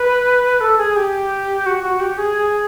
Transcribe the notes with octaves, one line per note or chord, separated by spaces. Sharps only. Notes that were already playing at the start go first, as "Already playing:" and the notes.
Already playing: B4
A4
G#4
G4
F#4
F#4
G4
G#4